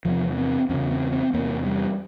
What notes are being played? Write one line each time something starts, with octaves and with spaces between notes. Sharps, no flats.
E2 C3 F3
C4
E2 C#3 C#4
C4
C4
E2 C3 A#3
G3